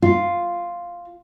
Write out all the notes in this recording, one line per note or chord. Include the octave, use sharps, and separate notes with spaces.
F4